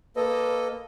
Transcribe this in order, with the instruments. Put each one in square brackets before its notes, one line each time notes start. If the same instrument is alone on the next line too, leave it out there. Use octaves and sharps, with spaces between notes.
[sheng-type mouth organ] A#3 A4 D#5 [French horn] B4